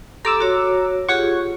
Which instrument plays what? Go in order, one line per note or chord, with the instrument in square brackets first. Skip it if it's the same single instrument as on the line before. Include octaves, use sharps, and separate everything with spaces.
[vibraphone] G4 A4 C6 [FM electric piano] A#5 D6 E6
[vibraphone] F#4 C#5
[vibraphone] F4 G4 G#4 [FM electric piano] C#5 F#5 C#6